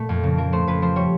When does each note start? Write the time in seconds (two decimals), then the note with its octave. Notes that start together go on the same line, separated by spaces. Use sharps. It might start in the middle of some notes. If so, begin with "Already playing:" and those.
Already playing: A#2 A3
0.09 F2
0.23 C#3
0.38 F3 A#4
0.53 A3 C5
0.67 F2 B4
0.82 F3 C5
0.96 G3 C#5